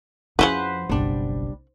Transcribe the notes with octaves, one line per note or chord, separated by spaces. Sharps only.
F2 C#3 F3 E4 F#4 B4 C5 F#5
F#1 B1 G3 D4